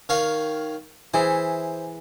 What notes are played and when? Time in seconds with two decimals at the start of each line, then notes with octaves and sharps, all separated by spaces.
0.09 D#3 C#5 F5
1.14 E3 G#4 C5 E5